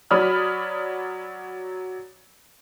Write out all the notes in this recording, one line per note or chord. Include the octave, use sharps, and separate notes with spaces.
F#3 C#5 D5 B5 D#6 F6